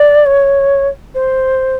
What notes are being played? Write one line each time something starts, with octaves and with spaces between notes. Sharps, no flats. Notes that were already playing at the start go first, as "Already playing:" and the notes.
Already playing: D5
C#5
C5